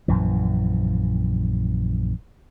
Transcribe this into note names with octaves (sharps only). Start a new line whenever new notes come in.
A#1 F#2 E3